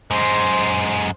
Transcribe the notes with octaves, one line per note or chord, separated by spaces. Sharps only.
F#2 G#3 C5